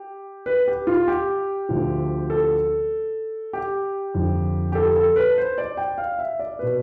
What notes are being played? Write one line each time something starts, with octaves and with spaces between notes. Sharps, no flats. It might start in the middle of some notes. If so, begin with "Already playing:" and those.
Already playing: G4
B4
G4
F4
G4
D2 D3 F3
A4
G4
F2 D3 F3
G4
A4
A4
B4
C5
D5
G5
F5
E5
D5
B2 B4